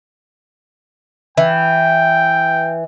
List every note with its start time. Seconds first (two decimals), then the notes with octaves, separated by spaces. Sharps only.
1.37 E3 G5